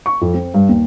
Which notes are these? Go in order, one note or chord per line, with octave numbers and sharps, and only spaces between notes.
C#6
F2
C4
G2
D#2